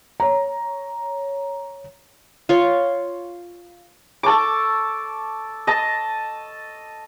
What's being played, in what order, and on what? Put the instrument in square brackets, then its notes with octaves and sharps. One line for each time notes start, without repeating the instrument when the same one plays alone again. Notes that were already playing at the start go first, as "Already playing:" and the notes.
[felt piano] C#5 A#5
[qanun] F4 C#5
[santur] A4 A5 C#6 D6
D#5 A5